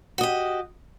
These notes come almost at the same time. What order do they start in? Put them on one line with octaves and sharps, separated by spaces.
F#4 D#5 G4